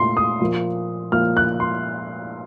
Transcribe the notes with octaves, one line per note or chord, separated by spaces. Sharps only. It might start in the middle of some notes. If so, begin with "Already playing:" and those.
Already playing: A#2 A3 C6
D#6
A#2 F3 A#3
A#2 F3 A#3 F6
F#6
C6